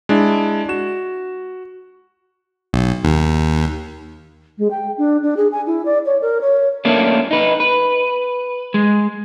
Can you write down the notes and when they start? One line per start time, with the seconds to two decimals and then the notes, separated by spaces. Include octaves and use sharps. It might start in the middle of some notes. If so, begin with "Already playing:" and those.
0.09 G#3 D4 E4
0.69 F#4 E7
2.73 B1
3.04 D#2
4.58 G#3
4.71 G5
4.98 D4
5.23 D4
5.37 G#4
5.52 G#5
5.67 E4
5.85 D5
6.06 C#5
6.22 A#4
6.41 C#5
6.85 A3 A#3 C#4 D4
7.31 D#4 B4
7.60 B4
8.74 G#3